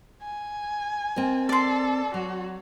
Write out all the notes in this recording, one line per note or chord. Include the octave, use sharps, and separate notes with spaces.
G#5
C4 A#4 D#5
A4 D5 C6
F#3 F#4